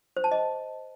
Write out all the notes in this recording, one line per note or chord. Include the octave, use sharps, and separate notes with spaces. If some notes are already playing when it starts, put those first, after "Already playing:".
C5
A5
D#5